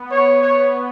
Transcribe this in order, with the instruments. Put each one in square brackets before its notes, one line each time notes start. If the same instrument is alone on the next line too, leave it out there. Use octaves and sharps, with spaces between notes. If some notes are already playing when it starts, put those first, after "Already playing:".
Already playing: [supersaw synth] B3
[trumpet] C#5
[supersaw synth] B3
[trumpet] C#5